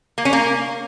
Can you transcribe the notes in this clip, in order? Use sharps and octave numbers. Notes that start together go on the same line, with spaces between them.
A#3
C#4
A#3